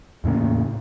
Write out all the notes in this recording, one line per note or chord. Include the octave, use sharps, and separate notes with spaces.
E2 A2 C#3 A#3